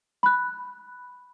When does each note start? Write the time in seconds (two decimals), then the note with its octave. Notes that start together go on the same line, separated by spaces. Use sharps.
0.23 B5 F#6